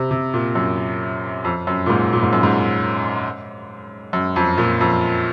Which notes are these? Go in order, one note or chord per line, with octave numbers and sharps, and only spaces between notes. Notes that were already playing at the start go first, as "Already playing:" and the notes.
Already playing: C3
C3
A#2
F#2
F2
F#2
A#2
G#2
A#2
G#2
F#2
G#2
F#2
F2
A#2
F2